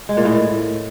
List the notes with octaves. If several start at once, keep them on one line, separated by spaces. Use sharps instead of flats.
G#3
A#2
A2